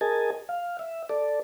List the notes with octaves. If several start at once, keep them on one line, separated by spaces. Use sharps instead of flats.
G#4 A#4 D#5 G#5 A5
F5
E5
A4 D5